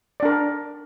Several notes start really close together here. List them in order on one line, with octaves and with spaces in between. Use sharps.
D5 D4 A#4